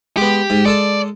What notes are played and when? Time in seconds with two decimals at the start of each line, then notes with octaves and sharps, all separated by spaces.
0.17 G#3 B3 G4
0.50 G#2
0.65 G#3 A4 D5 A5